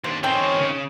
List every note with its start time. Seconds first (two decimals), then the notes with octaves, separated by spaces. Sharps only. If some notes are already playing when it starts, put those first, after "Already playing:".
0.04 D#2 D4 C5
0.23 E2 D#3 C4 C#4 A4 C5 C#5 G5
0.59 C#3